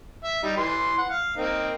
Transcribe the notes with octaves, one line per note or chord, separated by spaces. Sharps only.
E5
G3 D#4
E3 C6
F#5
F5
A#3 C4 D#4